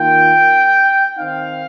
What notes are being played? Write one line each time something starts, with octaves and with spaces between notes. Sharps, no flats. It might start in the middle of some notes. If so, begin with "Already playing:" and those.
Already playing: D#3 A#3 F4 G5
D#3 C4 D#4 F5